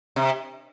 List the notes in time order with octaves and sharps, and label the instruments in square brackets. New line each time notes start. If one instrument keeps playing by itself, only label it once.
[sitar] C3